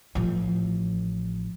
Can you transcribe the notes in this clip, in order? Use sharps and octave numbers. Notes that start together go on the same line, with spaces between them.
A1 F3